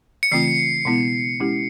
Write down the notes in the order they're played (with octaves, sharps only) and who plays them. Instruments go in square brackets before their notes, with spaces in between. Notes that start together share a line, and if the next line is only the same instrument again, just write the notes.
[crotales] C#7
[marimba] C#3 E3 A3 C4 F4 [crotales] C7
[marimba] B2 G#3 B3 E4
G#3 C#4 E4 G4